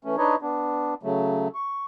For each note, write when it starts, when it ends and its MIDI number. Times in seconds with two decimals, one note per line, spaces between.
0.04 0.16 52
0.04 0.16 57
0.04 0.16 61
0.18 0.36 62
0.18 0.36 63
0.18 0.36 71
0.18 0.36 73
0.18 0.36 75
0.42 0.94 59
0.42 0.94 62
1.03 1.48 49
1.03 1.48 54
1.03 1.48 57
1.55 1.86 85